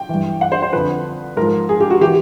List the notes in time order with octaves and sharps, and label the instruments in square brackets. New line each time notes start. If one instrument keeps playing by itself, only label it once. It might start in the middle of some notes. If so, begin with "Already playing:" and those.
Already playing: [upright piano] G5
G2 E3
F#5
C5
C5
F2 D3 F3 B4
G#2 F3 A#4
G#4
G4
F#4
E3 G4